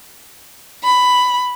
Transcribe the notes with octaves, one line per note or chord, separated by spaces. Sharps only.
B5